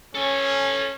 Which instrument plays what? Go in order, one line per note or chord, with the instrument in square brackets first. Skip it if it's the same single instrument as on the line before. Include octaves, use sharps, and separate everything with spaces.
[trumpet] C#4 [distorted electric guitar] A4 G#5